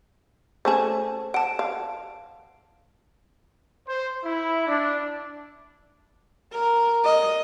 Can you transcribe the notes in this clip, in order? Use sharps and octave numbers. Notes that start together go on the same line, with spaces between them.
A3 C#4 G#4 C5 A5
F#5 A5 D7
F5
C5
E4
D4
A#4
D#5